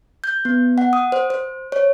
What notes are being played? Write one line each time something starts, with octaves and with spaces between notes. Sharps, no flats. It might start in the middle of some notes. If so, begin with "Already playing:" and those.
G6
B3
F#5
D#6
C5
C5
C#5